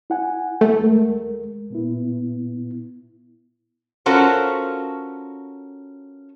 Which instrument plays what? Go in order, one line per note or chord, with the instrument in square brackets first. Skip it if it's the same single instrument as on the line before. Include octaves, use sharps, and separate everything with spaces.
[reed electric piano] E4 F#5 G#5
[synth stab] A3
[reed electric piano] D#2 G#3 A#4
A#2 B3 E4
[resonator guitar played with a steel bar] C#4 F4 F#4 A4 A#4 C5